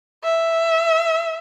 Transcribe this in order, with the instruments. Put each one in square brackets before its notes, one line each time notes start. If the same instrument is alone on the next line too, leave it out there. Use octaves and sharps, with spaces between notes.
[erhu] E5